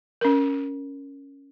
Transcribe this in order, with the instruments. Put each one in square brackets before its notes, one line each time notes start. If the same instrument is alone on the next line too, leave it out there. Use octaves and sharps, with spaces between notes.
[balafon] C#4 A#4